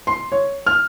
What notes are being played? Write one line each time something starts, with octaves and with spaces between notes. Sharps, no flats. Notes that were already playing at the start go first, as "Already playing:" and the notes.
C6
C#5
F6